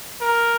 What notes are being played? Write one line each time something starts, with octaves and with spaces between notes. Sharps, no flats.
A#4